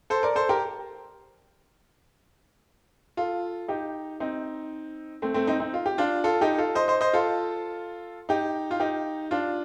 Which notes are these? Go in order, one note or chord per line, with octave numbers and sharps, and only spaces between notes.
A4 C5
A#4 D5
A4 C5
G4 A#4
F4 A4
D#4 G4
C4 D#4
A3 C4
A3 C4
C4 D#4
C4 D#4
F4
G4
D4 F4
F4 A4
D#4 G4
F4 A4
C5 D#5
C5 D#5
C5 D#5
F4 A4
D#4 G4
F4
D#4 G4
D4 F4